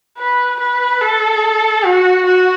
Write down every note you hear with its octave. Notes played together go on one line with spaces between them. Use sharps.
B4
B4
A4
F#4
F#4